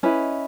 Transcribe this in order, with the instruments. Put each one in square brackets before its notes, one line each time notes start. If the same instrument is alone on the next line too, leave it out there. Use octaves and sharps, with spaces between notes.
[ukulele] C#4 E4 B4 D#5